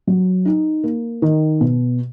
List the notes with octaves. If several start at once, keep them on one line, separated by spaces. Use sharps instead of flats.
F#3
D#4
A#3
D#3
B2